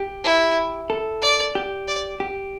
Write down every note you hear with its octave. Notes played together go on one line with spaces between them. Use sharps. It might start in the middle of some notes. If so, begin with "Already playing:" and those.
Already playing: G4
E4
A4
D5
G4
D5
G4